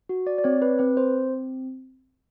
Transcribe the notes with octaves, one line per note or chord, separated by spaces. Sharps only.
F#4
D5
D5
C4 C#5
B4
C4 B4
C5